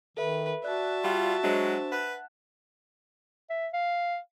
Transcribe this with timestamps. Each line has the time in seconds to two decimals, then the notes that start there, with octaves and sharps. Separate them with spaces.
0.17 D#3 A4 B4 E5
0.64 F#4 D5 E5 A5 F#6
1.04 G3 F4
1.43 F#3 G#3 D4 C5
1.92 B4 F#5 F#6
3.50 E5
3.74 F5